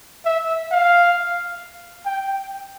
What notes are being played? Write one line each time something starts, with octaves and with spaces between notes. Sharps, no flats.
E5
F5
G5